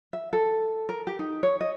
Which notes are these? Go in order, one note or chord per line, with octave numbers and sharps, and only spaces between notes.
E5
A4
A#4
G4
D#4
C#5
D#5